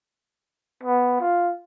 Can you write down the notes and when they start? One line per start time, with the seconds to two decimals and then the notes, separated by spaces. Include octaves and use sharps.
0.83 B3
1.20 F4